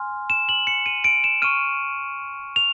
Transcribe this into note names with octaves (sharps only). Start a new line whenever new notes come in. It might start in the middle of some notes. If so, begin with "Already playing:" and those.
Already playing: G#5 C6 F6
E7
F#7
C#7
D#7
D7
E7
C#6 F6 D#7
F7